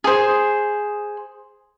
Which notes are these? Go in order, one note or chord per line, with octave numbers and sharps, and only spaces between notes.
G#4 C5